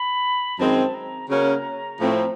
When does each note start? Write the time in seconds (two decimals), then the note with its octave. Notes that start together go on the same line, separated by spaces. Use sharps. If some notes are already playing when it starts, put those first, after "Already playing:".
Already playing: B5
0.59 F#2 D#3 G#3 C4 A5
0.94 A#5
1.30 C#3 F#3 A#3 C#4 A#5
2.00 A2 F3 A3 C4